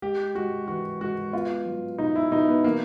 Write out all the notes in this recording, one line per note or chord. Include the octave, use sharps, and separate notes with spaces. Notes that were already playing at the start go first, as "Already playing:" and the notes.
G#3 G4
G#3 F#4
E3 F#4
G#3 F#4
B3 F4
F#3
B2 D#4
E4
B2 D#4
B3
E3 A#3